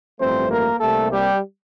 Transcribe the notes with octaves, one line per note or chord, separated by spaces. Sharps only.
A1 G2 F3 A3 C4 C5
A#3 A#4
C2 C3 G3 A3 A#3 A4
G3 G4